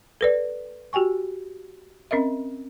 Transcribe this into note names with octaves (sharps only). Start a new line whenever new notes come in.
A4 B4 D5
F#4 G4 G5 G#5 C#6
C4 C#4 A#4 D#5 E5